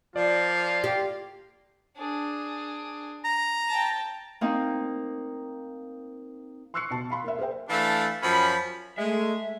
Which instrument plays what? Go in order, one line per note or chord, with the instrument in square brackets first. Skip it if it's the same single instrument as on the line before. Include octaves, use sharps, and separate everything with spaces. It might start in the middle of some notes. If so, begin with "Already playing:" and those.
[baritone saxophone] F3 [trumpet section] A#3 F4 [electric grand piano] D5
[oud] G4
[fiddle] D4 G#4
[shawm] A#5
[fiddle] G5 A5
[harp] A#3 C4 D#4
[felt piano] C6 C#6 E6 F#6 C7 C#7
B2 A5
F5 B5 C6
A#3 E5
G#4 A#4 C5 E5 G5
[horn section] E3 A3 D4 E5 F5 A5
F#2 F3 C#4 B5
[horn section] G#3 [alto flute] A3 [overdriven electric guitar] E5